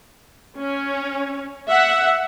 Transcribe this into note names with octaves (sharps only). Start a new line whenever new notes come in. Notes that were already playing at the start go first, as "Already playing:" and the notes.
C#4
E5 F#5